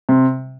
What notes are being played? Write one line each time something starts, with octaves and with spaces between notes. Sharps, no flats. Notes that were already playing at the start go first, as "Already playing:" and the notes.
C3